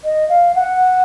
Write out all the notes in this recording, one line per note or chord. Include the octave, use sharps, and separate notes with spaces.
D#5
F5
F#5